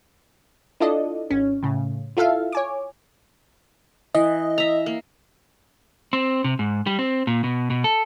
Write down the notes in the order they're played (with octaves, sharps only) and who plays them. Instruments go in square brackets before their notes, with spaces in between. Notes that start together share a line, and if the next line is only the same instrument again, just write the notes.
[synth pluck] D4 E4 F4 A4 D5 D#5
G#1 C#4
A2 C#3
E4 F4 A4 E5 F5
C#5 G#5 D6
[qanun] E3 [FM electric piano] D#5
[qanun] E5 A#5
A#3
[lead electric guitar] C4
C3
G#2
G3
C4
A#2
B2
B2
A4